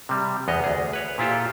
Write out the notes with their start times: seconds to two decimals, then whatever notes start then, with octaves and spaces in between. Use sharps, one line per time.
0.09 C3 G3
0.48 E2 B3 C#5 D#5
0.64 D2 G#4
0.93 B4 C#5 F#5
1.18 A#2 E4 F4 G4 A4